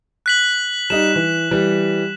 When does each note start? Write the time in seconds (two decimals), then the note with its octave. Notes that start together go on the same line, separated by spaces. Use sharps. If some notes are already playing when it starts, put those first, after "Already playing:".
0.26 F#6 B6 F#7
0.90 G3 D#4 E7
1.15 E3
1.51 E3 G3